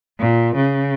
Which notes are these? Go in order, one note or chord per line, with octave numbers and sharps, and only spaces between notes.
A#2
C#3